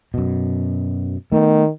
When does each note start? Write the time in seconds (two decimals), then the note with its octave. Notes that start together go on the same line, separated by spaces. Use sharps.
0.14 F#2 B2
1.32 D#3 A3 B3